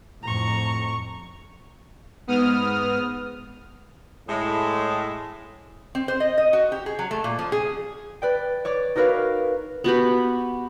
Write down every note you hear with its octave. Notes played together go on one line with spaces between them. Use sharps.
F2 A2 A#5 C#6
G#2 B3 D#6 F6
A2 G#3
C4
C5
D#5
D#5
F#4
G4
G#4
F#3
A3
A#2
F3
G#4
B4 D5 G5
C#5 D5 D6
D#4 F#4 A#4 B4 C#5 F5
B3 F#4 G4 B4